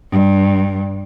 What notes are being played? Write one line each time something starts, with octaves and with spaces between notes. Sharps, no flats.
G2